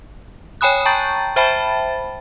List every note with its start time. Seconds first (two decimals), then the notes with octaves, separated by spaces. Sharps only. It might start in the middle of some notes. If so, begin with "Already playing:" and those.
0.61 C#5 G5 G#5 B5 D#6 F#6
0.85 G5 A5 A#5 C#6 G6 A6
1.36 C5 E5 G5 A5 B5 A6